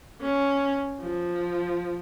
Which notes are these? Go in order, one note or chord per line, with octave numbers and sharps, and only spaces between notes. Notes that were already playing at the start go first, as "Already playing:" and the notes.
C#4
F3